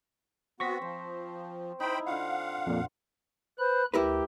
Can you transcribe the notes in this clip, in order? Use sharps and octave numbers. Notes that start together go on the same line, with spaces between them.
B3 C4 F#4 C#6 A#6 B6
F3 C5
D#4 E4 C5 G5 B5
D3 F4 F5 F#5
F2 A#2
B4 C5 B5 F#6
D2 E4 G4 A#4 B4